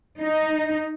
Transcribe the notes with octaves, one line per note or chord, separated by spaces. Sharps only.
D#4